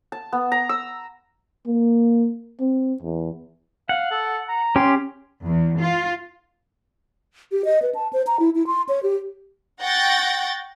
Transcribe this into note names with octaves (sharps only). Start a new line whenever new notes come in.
A5
B3
A#5
E6
A#3
C4
E2
F5 F#5
A4
A#5
C#4 G4 C6
E2
F4
G4
D#5
B4
A5
C5
A#5
E4
E4
C6
C#5
G4
F#5 G5 C#6 G6 A6 A#6